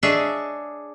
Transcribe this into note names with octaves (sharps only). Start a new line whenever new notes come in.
D4 G#4 C#5 D#5 E5